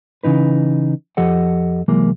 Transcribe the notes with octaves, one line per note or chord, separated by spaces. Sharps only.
C#3 E3 D#4 B4
F2 F3 G4 A4 D#5 F#5
C2 E3 F#3 G#3 A#3